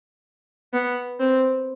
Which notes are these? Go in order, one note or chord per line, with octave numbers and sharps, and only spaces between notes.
B3
C4